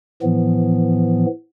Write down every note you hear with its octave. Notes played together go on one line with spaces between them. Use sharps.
A2 E3 F3 B3